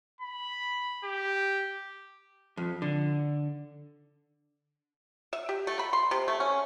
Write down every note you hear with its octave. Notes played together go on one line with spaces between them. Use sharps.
B5
G4
F2
D3
E5
G4
A3
B5
C6
C3
A3
C#4